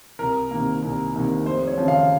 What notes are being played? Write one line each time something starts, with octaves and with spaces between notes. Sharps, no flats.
C2 A#4
C3 D#3 A#3
C2
C3 D#3 A#3
F1 C5
C#5
D#2 C#3 F3
F5